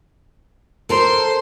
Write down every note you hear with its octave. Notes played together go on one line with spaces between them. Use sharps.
A4 A#4 C5 C6